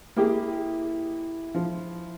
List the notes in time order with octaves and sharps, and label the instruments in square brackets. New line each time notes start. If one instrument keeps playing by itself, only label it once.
[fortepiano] A#3 G4 G#4 [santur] E4 D#5
[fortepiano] F3